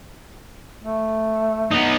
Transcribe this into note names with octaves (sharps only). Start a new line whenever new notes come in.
A3
B3 D#4